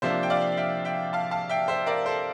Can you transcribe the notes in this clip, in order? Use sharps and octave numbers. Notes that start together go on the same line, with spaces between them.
C3 F3 A#3 D4 C5 E5
G5
D5 F5
E5 G5
E5 G5
F5 A5
F5 A5
E5 G5
C5 E5
A#4 D5
A4 C5